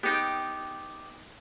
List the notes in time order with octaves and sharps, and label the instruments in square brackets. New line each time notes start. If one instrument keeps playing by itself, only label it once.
[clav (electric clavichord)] B3 D#4 [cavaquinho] G4 G5